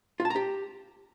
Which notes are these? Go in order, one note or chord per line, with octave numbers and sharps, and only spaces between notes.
F4
A5
A#5
G4